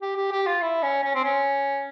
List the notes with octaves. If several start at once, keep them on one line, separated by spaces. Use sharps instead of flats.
G4
G4
G4
F4
E4
C#4
C#4
C4
C#4